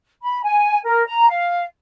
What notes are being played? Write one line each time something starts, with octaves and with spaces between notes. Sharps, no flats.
B5
G#5
A#4
A#5
F5